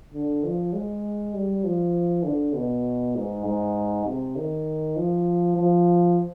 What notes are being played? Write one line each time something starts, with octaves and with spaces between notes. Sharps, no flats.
D3
F3
G#3
G3
F3
D3
B2
G#2
G#2
C3
D#3
F3
F3